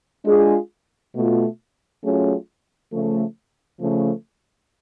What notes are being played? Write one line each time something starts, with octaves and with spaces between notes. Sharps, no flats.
G#3 D4 F4 G#4
B2 A3 F4
F#3 A3 C#4 F4 G#4
C#3 F3 A3
C#3 F3 A3